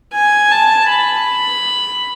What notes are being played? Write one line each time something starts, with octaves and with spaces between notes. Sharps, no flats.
G#5
A5
B5